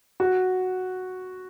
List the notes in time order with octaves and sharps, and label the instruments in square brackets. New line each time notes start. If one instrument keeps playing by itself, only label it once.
[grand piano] F#4